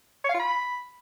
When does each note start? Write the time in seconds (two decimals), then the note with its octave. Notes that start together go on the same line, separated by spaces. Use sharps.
0.24 C#5
0.29 F5
0.34 F4
0.39 B5